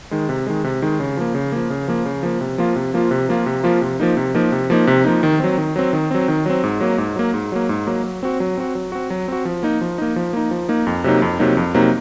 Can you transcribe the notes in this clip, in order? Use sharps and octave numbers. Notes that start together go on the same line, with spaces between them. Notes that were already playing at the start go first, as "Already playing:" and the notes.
D#3 G#3
C3
D#3 G#3
C3
D#3 G#3
C#3
F3 A#3
C#3
F3 A#3
C#3
F3 A#3
C#3
F3 A#3
C3
F3 A#3 F4
C3
F3 A#3 F4
C3
F3 A#3 F4
C3
F3 A#3 F4
C3
F3 A#3 D#4
C3
F3 A#3 D#4
C3
F3 A#3 D#4
C3
F3 A#3 D#4
D#3
F#3 C4
D#3
F#3 C4
D#3
F#3 C4
D#3
F#3 C4
G#2
F#3 A#3
G#2
F#3 A#3
G#2
F#3 A#3
G#2
F#3 A#3
F#3
C4 F#4
F#3
C4 F#4
F#3
C4 F#4
F#3
C4 F#4
F3
A#3 D#4
F3
A#3 D#4
F3
A#3 D#4
F3
A#3 D#4
F2
C3 F#3 A#3 D#4
F2
C3 F#3 A#3 D#4
F2
C3 F#3 A#3 D#4